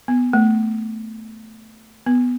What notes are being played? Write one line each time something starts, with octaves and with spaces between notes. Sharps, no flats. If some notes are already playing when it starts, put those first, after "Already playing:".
B3
A3
B3